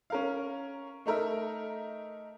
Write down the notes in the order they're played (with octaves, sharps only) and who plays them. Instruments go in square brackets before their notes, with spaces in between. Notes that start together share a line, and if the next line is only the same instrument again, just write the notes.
[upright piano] C#4 A#4 F5
A3 D#4 A#4 E5